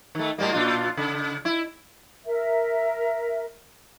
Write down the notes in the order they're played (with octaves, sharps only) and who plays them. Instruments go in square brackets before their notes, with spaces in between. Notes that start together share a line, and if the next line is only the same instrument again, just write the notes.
[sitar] D#3 A3
A2 G3 A#3
A#2 D4 F4
C#3
E4
[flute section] A#4 E5